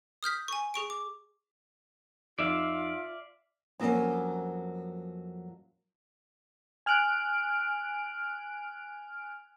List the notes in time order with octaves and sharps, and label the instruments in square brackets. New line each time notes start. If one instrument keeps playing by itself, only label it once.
[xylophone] D#6 F6 G6 B6
G#5 C#6
G#4 C#6 D7
D6
[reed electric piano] F2 D#4 [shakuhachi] F4 [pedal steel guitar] D5 E5 F5
[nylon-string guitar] F2 F#3 A#3 C4 C#4
[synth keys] G#5 F6 F#6 D7